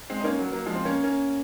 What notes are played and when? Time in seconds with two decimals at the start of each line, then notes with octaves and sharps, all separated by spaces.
0.10 G#3 C4
0.20 D#4
0.24 A#3 C#4
0.39 F#3 A#3
0.52 F#3 A#3
0.66 F3 G#3
0.75 C4
0.85 A#3 C#4
1.04 A#3 C#4